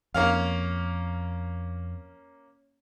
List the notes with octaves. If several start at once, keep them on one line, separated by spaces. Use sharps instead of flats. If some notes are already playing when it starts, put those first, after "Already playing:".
F2 A#3 C#4 F5